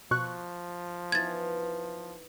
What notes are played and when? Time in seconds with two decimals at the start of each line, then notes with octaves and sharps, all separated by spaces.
0.11 B2 F3 C#6 F#6
1.12 E3 B3 D#4 G#6 A6